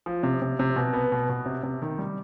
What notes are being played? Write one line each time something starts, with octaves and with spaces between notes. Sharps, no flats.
F3
C3
C3
C3
B2
B3
B2
B2
C3
C3
D#3
G3